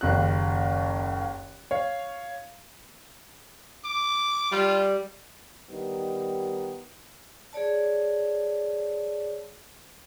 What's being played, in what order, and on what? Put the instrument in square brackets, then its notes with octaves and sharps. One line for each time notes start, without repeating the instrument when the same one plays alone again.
[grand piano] F#1 D#2 F#6
C#5 F5
[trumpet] D6
[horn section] G3 [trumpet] F4
[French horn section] D#3 G3 B3 D#4
[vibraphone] G#4 C#5 D5 A5